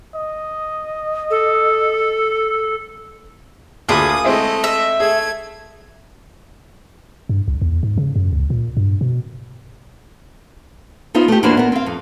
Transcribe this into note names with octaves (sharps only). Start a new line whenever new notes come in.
D#5
A4
D2 A#3 F4 G#4 B5 D#6
G#3 A3 C4 E4 D#5
E5
A3 G#4 G#6
G2
C2
E2
G#2
C#3
F#2
C#2
A#2
G2
B2
B3 D#4 F4 C5
A3 G4
E2 E3 A#3 D4 F#4 C5
B3 A#4
C4 F5
F2